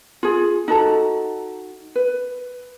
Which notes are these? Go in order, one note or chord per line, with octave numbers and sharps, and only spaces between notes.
F4 G#4
D#4 F#4 A4 A#5
B4